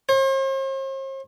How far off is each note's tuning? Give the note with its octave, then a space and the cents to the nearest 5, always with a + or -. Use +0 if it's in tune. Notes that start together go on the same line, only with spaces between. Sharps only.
C5 +45